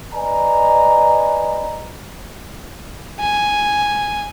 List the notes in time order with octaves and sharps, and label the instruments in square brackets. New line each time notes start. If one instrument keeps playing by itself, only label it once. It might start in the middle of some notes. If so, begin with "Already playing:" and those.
[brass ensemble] B4 D5 D#5 G#5 A#5
[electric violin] G#5